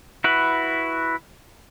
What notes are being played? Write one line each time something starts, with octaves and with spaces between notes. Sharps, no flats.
E4 F#4 B4